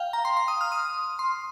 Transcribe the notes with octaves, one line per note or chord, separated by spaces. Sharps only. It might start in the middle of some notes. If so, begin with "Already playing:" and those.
Already playing: F5 G5
A#5
C6
C6
D#6
F6
D#6
C6